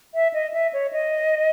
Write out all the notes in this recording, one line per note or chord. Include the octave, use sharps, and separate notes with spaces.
E5
D#5
E5
C#5
D#5